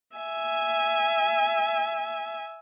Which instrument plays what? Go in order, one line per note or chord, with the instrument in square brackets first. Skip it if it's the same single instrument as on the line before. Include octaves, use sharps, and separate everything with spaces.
[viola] E5 G#5